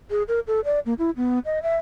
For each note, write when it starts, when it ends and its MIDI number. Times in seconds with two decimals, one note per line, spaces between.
0.10 0.23 68
0.28 0.40 70
0.47 0.60 69
0.65 0.80 74
0.86 0.94 58
0.99 1.11 64
1.17 1.39 59
1.45 1.62 75
1.63 1.76 76